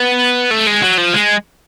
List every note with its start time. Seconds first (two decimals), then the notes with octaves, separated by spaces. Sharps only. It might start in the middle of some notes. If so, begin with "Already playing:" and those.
Already playing: B3
0.51 A3
0.67 G#3
0.82 F#3
0.98 F3
1.13 G#3